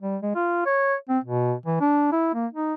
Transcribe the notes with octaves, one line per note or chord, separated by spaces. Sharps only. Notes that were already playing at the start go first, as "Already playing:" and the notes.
G3
G#3
F4
C#5
C4
B2
E3
D4
E4
A#3
D#4